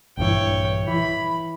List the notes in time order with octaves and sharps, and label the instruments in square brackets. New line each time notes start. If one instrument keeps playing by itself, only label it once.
[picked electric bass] A#1 G2 E3 [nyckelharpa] C#5 G5
[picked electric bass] E3 [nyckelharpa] B5